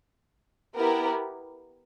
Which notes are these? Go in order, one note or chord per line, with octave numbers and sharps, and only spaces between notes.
B3 E4 G4 A#4